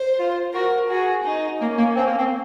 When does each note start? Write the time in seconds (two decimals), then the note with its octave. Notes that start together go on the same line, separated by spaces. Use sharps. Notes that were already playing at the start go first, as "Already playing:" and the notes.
Already playing: C5
0.18 F4
0.53 F#4 A#4
0.88 F#4 G#4
1.24 D#4
1.59 A#3 C#4
1.77 A#3
1.95 C4
2.06 A#3
2.17 C4